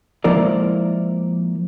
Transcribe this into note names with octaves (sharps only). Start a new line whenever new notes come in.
F3 G#3 A#3 E4 A#4 D5